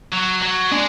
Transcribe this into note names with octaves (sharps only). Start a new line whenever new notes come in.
F#3
F#3
G#3 D4